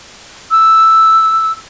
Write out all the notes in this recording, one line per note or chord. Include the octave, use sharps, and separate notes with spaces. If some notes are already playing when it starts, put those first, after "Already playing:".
E6